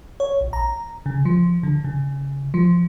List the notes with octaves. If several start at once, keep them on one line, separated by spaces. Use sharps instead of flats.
C#5
A#1
A#5
C#3
F3
D3
C#3
F3